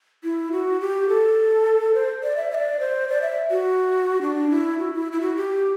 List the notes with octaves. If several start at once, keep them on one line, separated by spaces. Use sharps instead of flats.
E4
F#4
G4
A4
C5
D5
E5
E5
D5
C5
D5
E5
F#4
D4
E4
F#4
E4
E4
F#4
G4